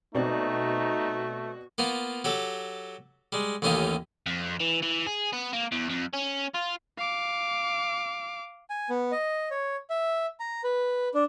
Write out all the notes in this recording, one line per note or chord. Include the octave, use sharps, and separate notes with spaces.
B2 A3 C4 D#4 F#4 D5
A#3 B3 F4
F#3 G4 A4
G3 G#3
A1 D#2 A3 C#4 D#4 F4
F2
E3
E3
G#4
B3
A#3
E2
F2
C#4
F4
F5 D6
G#5
B3
D#5
C#5
E5
A#5
B4
D4